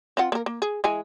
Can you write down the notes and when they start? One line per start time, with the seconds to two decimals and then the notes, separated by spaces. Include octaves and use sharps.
0.17 C4 F4 F#5
0.32 A#3 A#4
0.46 A#3
0.62 G#4
0.84 E3 G#3 G#5